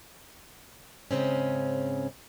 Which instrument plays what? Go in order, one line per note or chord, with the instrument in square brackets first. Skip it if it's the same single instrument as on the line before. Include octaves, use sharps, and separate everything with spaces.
[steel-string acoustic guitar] G#2 C#3 C4 C#4